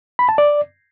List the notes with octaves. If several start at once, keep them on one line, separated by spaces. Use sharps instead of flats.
B5
A5
D5